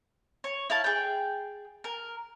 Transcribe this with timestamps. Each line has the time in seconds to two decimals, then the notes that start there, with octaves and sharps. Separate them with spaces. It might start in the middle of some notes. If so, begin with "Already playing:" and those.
0.44 C#5
0.70 E4 F5 A5
0.84 G#4 G5
1.84 A#4